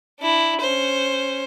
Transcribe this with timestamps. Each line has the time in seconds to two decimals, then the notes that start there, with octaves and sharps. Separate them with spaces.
0.20 D4 E4
0.60 C#4 C5